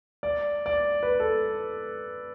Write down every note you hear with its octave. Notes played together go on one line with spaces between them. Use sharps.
D5
D5
B4
A4